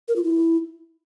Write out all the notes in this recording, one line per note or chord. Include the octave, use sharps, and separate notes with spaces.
A#4
F4
E4